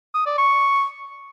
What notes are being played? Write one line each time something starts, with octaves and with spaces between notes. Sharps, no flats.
D#6
D5
C#6